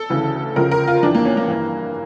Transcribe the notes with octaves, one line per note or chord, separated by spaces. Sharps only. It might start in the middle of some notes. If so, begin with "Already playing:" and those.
Already playing: A4
D2 C#3 E3
C#2 C#3 F3 A#4
A#4
F4
F2 E3 D4
A#3
C#4
A#3
G2 E3